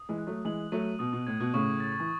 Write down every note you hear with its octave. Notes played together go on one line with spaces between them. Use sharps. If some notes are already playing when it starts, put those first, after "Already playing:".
Already playing: D#6
E3 G#3
F#6
F#3 A3
E3 G#3 F#7
F#3 A3 D#7
B2 D#6
B2
A2 G#6
B2
A2 C#3 C#6
A6
E3